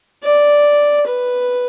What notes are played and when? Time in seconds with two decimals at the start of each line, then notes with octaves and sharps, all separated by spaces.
0.23 D5
1.06 B4